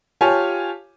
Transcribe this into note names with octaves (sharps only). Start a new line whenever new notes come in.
F4 G4 C#5 G#5 A5